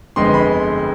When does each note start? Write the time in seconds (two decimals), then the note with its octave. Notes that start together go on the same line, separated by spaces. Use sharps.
0.16 G1 F2 D3 G#3 B3 C6
0.34 B5